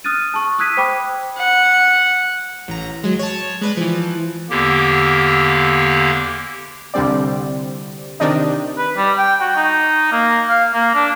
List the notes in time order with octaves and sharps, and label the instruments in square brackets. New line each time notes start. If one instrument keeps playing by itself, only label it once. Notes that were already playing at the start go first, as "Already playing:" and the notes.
[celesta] D#6 F6 F#6 A6 D#7
A5 C#6
D#6 E6 F#6 G#6 B6 D#7
C5 G5 B5 D6
[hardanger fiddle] F#5
[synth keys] A1 A#5
F#3 G#3
C#5 A5
G#3 B4 D5
E3 F3
[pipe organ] E2 D3 A#3 G4
[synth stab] C2 D3 G3 C4 D5
C3 D#3 D4 D#4
[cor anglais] B4
G3
G5
F#4
D#4
A#3
F5
A#3
D4